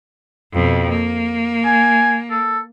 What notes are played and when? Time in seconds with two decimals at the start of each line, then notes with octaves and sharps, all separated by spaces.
0.54 F2 B2
0.89 A#3
1.65 G#5
2.30 A4